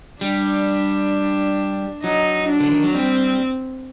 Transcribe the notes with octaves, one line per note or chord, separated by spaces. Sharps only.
G3 D4
F#3 D#4
D4
D3
D#3
F#3
G3 C4